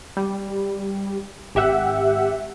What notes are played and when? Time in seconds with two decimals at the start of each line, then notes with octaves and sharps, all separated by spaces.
0.17 G3
1.55 G#1 G4 E5 F#5